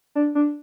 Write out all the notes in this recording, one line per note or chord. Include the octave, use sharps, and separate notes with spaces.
D4
D4